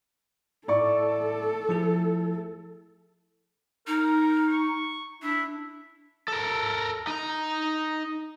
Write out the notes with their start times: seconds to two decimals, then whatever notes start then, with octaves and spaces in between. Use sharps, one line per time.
0.68 A2 A4 D5 C#6
1.69 F3 A3 E4 G#4
3.87 D#4 A#4
4.48 C#6
5.22 D4 E4
6.28 A4 A#4
7.07 D#4 A#5